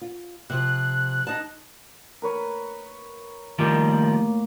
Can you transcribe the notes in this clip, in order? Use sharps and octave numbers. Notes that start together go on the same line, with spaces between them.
F4
C3 F3 F#6
D#4 A5
A#4 B4 C#5
A2 D#3 F3 G3 A#3